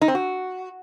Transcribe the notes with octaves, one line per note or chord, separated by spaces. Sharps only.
D#4
C4
F#4